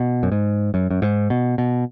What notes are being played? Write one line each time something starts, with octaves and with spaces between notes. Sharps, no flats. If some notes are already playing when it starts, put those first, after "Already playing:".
Already playing: B2
F#2
G#2
F#2
F#2
G#2
B2
B2